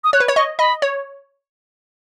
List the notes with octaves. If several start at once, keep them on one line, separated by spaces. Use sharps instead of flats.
D#6
C#5 F#6
B4
C#5
D#5 C#6
D#5 B5
C#5